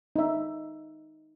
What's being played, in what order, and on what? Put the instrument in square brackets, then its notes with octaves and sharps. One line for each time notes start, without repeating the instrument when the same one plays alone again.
[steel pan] D#4 E5